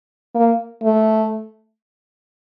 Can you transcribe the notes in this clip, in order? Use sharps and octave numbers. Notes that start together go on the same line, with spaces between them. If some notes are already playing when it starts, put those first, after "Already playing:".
A#3
A3